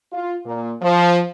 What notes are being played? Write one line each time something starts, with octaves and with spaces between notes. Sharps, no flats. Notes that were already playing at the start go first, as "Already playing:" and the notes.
F4
A#2
F3